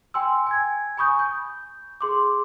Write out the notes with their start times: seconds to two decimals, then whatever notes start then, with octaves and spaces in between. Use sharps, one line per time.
0.14 G5 G#5 C6 E6
0.47 G#5 G#6
0.97 G#5 B5 C#6 D#6 G6
1.19 G6
2.01 G#4 C6 D6